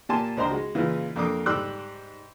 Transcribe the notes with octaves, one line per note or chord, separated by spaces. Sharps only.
A#2 A#3 G4 G#5 A5 C6
C#2 D4 C5 D#5 A#5 C6
G#3 F#4
A#2 C#3 E3 G#3 F4
F2 A#3 D4 D6 D#6
G#2 G3 C6 D6 E6 F#6